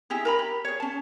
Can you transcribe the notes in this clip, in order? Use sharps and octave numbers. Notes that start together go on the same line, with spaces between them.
D#4 E4 G4 G#4
A#4 A#5 B5
G4
G#4 C#5
C#4 A5